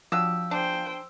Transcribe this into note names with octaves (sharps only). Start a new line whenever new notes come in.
F3 F#3 D4 G4 E6
D4 G#4 C5 G5